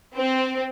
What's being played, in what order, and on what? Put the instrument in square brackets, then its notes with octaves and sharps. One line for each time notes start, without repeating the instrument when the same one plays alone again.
[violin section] C4